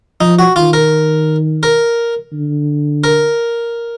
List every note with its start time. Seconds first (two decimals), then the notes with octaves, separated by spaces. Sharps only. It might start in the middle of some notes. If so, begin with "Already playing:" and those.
0.21 F3 D#4
0.39 F#4
0.56 D#3 F4
0.73 A#4
1.63 A#4
2.33 D3
3.04 A#4